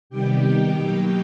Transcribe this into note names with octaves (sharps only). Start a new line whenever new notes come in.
C3 D#3 G3 B3 G4 G5
D#3 G3 B3 D#4
B2 F#3 A#3 D#4